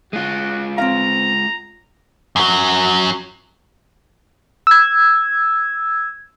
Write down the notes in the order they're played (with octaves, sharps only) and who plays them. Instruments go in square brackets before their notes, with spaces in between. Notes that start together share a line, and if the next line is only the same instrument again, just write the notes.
[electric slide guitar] G#3 F4 [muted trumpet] F#4
[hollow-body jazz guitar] C4 F5 [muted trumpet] A#5
[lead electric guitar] F#2 F#3
[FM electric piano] E6 G#6